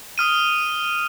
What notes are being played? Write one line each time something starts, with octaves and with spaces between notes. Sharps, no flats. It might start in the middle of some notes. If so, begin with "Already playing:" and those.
D#6 F6 D#7